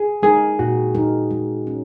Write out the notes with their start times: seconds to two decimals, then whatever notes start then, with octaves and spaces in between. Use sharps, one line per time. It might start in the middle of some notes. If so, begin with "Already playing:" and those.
Already playing: G#4
0.23 G#3 D#4 G#4 A#4
0.59 A#2 F#4
0.95 G#3 D#4 A#4
1.31 G#3
1.67 C#4